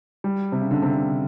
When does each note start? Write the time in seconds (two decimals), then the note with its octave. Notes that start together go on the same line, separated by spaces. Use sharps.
0.24 G3
0.52 C3
0.61 C#3
0.71 D3
0.82 C3
0.94 D3